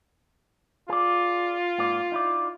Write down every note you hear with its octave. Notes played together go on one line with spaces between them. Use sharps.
F4 G#4 D5
G#2 A#3 D5
D#4 E4 D5